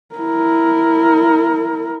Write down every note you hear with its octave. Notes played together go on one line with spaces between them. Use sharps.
E4 A#4